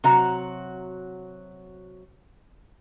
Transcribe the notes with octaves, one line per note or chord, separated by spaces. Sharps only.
C3 F#3 F#4 A#5